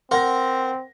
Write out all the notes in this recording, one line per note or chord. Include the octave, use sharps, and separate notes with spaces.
C4 A#4 C5 F#5 A#5 A#6